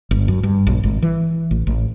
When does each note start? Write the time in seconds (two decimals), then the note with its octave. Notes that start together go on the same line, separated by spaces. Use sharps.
0.11 G1
0.28 F#2
0.43 G2
0.67 A#1
0.84 G#1
1.02 E3
1.51 A1
1.67 A1